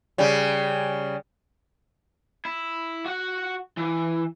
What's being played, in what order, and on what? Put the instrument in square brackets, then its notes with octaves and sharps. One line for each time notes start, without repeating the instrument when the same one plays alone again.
[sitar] C#3 G3
[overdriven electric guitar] E4
F#4 F#5
E3